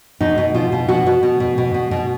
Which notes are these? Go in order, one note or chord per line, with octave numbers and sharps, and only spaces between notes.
B2 D#4
B2
B2 F4
B2
B2 F#4
B2
B2
B2
B2
B2
B2